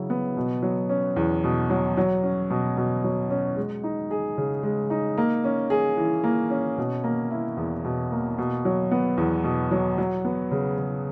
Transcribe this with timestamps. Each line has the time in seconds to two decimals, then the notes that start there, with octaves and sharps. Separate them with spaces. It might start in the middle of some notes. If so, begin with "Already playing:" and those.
Already playing: C#3 F#3 E4
0.10 B3
0.37 B2
0.62 F#3
0.90 C#4
1.16 E2
1.44 B2
1.70 F#3
1.97 F#3
2.23 C#4
2.50 B2
2.77 B2
3.04 F#3
3.30 C#4
3.56 G#3
3.84 D#4
4.11 G#4
4.38 C#3
4.63 G#3
4.90 D#4
5.18 A#3
5.44 C#4
5.70 G#4
5.97 E3
6.24 A#3
6.50 C#4
6.78 B2
7.04 A#3
7.31 E4
7.57 E2
7.85 B2
8.12 A#3
8.38 B2
8.65 F#3
8.91 B3
9.17 E2
9.44 B2
9.71 F#3
9.98 F#3
10.25 B3
10.51 C#3
10.78 C#3